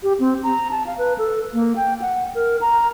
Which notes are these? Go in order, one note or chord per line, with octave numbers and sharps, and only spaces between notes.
G4
C4
A#5
A5
F5
B4
A4
A#3
G5
F#5
A#4
A#5